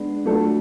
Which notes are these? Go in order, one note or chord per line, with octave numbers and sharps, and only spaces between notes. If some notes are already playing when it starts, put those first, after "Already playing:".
Already playing: G#3 B3 D4
F#3 A3 D4 F4 A4